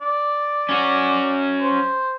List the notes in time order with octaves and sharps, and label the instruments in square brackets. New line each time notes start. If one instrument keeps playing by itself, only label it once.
[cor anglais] D5
[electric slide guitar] C#4 F#4
[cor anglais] C5